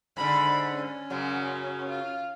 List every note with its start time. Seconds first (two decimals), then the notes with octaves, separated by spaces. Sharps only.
0.17 G#2 D3 B5
0.73 C#4
1.10 F#2 C#3 F#3
1.89 F4